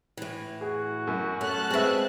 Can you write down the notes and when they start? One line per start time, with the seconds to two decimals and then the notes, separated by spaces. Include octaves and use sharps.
0.17 A2 E3
0.61 F#4 G#4
1.07 F#2
1.41 A3 C#4 A5 F#6
1.71 G#3 C4 G#4 B4 E5